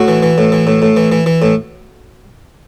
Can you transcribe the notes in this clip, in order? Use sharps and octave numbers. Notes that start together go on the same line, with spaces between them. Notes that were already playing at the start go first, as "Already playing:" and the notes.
Already playing: A2 F#4
E3
E3
A2
E3
A2
A2
E3
E3
E3
A2